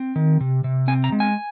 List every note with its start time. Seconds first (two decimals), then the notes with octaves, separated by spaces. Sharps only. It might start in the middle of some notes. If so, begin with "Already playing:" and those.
Already playing: C4
0.16 D#3
0.41 C3
0.64 C3
0.88 C4 G#5
1.04 A#5
1.12 G#3
1.20 G#5